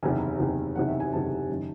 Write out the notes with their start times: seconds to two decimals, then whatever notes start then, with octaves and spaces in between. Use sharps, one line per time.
0.03 F#1 E2 C3 D#3 G#5
0.39 F#1 E2 C3 D#3
0.76 F#1 E2 C3 D#3 F#5
0.88 E5
1.00 G#5
1.13 F#1 E2 C3 D#3 A5
1.49 F#1 D#3